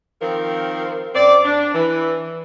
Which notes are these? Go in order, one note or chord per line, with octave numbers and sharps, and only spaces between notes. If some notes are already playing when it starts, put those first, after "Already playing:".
D#3 F3 C4 A#4
F#2 C4 D5
D4
E3